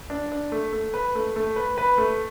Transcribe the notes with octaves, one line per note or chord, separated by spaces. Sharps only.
D4
D4
A3
A3
B4
A3
A3
B4
B4
A3